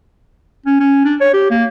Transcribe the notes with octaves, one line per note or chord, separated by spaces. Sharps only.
C#4
C#4
D4
C#5
G4
A#3